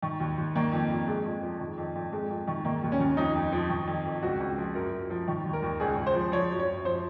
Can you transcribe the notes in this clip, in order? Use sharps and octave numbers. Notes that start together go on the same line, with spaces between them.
D#3
D#2
D#2
D#3 A#3
F2
F2
F2 G#3
F2
F3
D#3
F2
F2
F2 G#3
F2
D#3
D#3 A#3
D#2
C#4
D#2
F2 D#4
F2
F3
D#3
F2
F2
C#2 F#4
C#2
F3
F#2 A#4
F#2
F3
D#3
D#2
A#4
D#2
C#2 G#4
C#2
C5
F3
F3 C#5
F#2
C#5
F#2
F3 C5